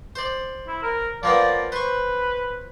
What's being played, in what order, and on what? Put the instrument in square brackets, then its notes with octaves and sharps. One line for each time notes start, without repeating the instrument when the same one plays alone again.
[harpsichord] C5 D5
[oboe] E4
A#4
[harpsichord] F3 A#3 B3 [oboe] D5
[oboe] B4 [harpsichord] C5 C#6